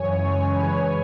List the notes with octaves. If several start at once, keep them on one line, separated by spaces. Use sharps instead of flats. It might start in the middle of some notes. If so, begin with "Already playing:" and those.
Already playing: F#2 C#3 E3 C#5 G#5
G#3
E3 B4
C#3